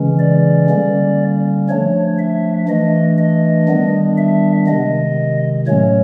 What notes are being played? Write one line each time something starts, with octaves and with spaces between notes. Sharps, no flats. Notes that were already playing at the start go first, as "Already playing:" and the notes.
Already playing: C#3 E3 G#3 C#4
D5
D3 G3 A#3 C#4
F3 A3 D4 C#5
E5
E3 A3 D4 D#5
D#5
D#3 G3 B3 D4
E5
C3 D#3 G#3 D#5
A2 F#3 A3 C#4 C#5